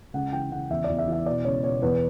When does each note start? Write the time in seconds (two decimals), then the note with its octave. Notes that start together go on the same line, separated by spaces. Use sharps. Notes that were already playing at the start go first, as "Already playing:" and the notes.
0.14 C#2 F#5
0.32 E3 G5
0.51 C#2 F#5
0.70 E2 E5
0.84 E2 D5
0.98 E5
1.07 E3
1.12 E5
1.26 B2 D5
1.45 C#2 C#5
1.63 B2 C#5
1.82 E2 B4